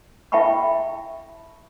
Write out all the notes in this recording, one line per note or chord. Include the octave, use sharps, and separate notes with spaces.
E4 E5 G5 A5 B5 C#6